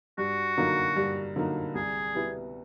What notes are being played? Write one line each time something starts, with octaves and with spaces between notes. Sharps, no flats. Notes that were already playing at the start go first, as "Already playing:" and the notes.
G2 F#4
D3 F#3 A#3 D#4
G2
D3 F#3 A#3 D#4
C2 G#4
B2 G3 B3 E4